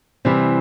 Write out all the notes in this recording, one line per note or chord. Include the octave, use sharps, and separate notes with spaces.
C3 E3 G3 C4